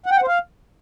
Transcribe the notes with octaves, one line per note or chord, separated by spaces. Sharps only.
F#5
G5
F#5
C5
F5